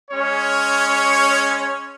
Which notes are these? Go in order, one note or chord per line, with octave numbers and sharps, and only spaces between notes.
G#3 C#4 C#5